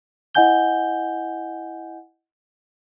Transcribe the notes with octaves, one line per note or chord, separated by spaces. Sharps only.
E4 D#5 F#5 G#5 G6 G7